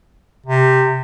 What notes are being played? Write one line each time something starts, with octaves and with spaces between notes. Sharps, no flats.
C3